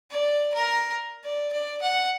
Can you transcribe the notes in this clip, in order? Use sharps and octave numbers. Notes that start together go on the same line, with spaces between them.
D5
A#4
D5
D5
F#5